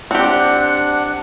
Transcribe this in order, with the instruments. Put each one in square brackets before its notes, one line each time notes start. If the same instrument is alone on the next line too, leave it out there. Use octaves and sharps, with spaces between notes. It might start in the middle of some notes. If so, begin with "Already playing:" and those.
[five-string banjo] C4 G4 [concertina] D4 F#5